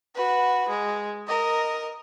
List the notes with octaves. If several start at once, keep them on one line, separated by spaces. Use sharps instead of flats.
F#4 B4
G#3
A#4 D#5